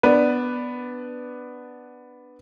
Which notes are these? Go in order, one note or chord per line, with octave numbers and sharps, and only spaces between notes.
B3 D4 B4